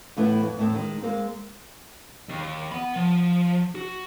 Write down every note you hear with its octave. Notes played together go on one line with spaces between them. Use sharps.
A2 E3 A3 B3 E4
F2
E2 A2 A3 C4
D#3 G#3
G#3 A#3 C4
D#2
F#5 B5
F3
F#4